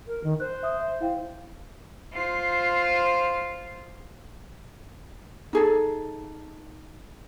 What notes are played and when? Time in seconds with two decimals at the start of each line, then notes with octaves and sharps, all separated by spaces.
0.08 A#4
0.24 D#3
0.40 C5 F#6
0.63 E5 D#6
0.79 E5
1.00 E4 F5 G5
2.13 F4 C5
5.53 D#4 G#4 A4